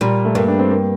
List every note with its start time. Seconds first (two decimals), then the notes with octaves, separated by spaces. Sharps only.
0.01 A#2 G3
0.25 A3
0.35 G2 A#3
0.48 D4
0.59 C4
0.71 A#3